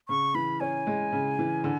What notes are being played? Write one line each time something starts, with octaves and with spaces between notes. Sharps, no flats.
C#3 C#6
E3 B5
C#4 G#5
G#3
C#3
E3
D3